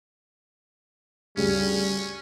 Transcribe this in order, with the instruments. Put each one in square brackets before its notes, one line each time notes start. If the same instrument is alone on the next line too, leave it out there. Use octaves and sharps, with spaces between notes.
[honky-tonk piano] D2 G2 C#3 [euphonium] G3 [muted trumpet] C#4